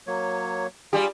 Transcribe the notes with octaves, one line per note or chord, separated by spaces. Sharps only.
F#3 A#3 C#5
G3 F4 G4 G#4